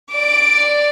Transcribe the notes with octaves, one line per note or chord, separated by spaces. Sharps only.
D5 D6